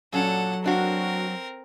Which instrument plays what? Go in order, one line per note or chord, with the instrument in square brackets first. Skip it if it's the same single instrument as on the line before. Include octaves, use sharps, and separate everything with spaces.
[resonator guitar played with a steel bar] A#2 C#4 D4 [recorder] F#3 [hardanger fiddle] A4 F#5
[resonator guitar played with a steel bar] A#3 D4 F#4 [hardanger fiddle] C4 A#4